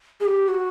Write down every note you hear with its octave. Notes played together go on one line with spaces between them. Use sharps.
G#4
G4
F#4